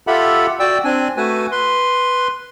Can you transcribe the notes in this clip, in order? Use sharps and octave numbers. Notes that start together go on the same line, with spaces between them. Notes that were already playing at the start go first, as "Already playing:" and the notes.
F4 G4 A4 E5 F#5 B5
F#4 D5 G5 E6
C4 D4 G#5
A3 F#4 B4 G#5
B4 C6